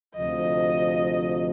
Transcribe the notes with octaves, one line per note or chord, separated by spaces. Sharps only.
D2 C3 F3 D#5